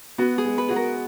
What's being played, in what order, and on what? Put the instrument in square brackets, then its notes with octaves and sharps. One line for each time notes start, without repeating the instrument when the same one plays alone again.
[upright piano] B3 [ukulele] F#4
[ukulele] G#4
[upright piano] G#3
[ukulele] B4
[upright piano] F#4 [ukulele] G#4
[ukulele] A#4